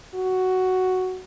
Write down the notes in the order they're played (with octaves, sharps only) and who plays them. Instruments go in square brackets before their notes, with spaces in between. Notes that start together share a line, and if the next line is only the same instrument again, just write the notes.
[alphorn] F#4